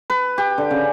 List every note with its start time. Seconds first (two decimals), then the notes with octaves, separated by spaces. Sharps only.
0.10 B4
0.38 G4
0.58 D3
0.71 C#3